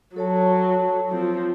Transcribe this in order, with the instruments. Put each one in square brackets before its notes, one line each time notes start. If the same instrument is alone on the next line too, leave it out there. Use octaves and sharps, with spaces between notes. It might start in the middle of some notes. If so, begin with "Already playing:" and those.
[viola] F#3 [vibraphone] A4 C#5 A5
[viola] F3 C4